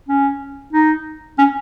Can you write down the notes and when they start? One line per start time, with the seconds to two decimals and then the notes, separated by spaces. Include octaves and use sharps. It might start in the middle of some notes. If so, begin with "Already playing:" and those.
0.09 C#4
0.73 D#4
1.38 C#4